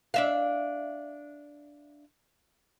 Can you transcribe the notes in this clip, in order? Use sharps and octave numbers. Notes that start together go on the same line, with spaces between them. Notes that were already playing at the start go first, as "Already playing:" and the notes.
D4 E5 F5